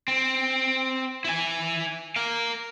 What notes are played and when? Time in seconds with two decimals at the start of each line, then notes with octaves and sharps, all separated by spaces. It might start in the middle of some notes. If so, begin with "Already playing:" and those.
0.08 C4
1.25 E4 G#5
2.16 A#4 F5